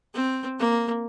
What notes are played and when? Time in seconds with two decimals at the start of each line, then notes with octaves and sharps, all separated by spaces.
0.14 C4
0.59 A#3